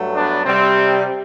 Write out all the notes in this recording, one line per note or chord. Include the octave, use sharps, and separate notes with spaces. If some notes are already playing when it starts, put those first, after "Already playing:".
Already playing: G2 F#3 A3
B3 D4
C3 G3 C4